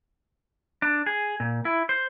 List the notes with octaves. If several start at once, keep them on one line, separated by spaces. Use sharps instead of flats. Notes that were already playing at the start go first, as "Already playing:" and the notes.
D4
G#4
A#2
E4
C5